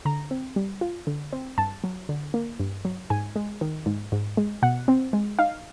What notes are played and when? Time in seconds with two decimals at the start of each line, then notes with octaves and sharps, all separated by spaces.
0.05 D3 A#5
0.31 C4
0.56 G3
0.81 F4
1.07 D3
1.33 C4
1.58 G2 A5
1.84 F#3
2.09 D3
2.34 A#3
2.59 G2
2.85 F#3
3.10 G#2 G#5
3.36 G#3
3.61 D#3
3.86 G#2
4.12 G#2
4.37 G#3
4.62 B2 F#5
4.88 C4
5.13 G#3
5.39 D#4 F5